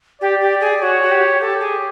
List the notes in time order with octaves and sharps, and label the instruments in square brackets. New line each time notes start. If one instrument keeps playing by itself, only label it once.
[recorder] G4 [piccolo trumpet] D5
[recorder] G4
G#4
[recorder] F#4 [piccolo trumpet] C#5
[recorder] F#4
G4
[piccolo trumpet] G4 [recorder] A4
[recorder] G#4